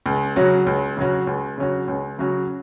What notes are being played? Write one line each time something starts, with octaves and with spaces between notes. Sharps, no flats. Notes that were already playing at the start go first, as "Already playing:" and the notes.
C#2
C#3 F#3 C#4 F#4
C#2
C#3 F#3 C#4 F#4
C#2
C#3 F#3 C#4 F#4
C#2
C#3 F#3 C#4 F#4